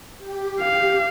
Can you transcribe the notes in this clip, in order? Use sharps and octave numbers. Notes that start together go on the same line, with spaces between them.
G4
F5